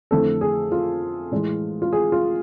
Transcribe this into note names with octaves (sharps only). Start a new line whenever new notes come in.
F2 D3 A3 C4 E4 A4
G#4
F4
A2 E3 G#3
F4
G#4
F4